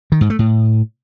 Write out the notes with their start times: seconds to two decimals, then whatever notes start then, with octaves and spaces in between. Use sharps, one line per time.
0.12 D#3
0.21 G#2
0.30 A3
0.39 A2